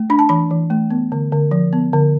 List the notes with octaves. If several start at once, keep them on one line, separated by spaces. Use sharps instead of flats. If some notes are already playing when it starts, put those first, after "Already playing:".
Already playing: A3
D4 B5
A5
E3 B5
E3
A3
B3
D3
D3
F3
B3
D3